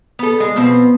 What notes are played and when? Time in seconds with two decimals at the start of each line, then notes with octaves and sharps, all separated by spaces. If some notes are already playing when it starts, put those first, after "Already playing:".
0.19 B3 A4
0.40 G#3
0.56 B2 F3 B3 C4